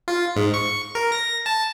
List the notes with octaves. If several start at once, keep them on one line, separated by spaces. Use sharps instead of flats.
F4
G#2
C#6
A#4
A#6
A5